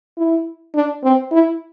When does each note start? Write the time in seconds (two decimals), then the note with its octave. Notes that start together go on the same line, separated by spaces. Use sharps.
0.17 E4
0.75 D4
1.04 C4
1.32 E4